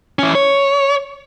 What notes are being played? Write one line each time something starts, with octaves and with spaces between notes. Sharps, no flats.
E3 C#4
C#5